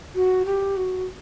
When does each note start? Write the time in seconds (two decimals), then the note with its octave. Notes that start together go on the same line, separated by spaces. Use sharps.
0.15 F#4
0.45 G4
0.77 F#4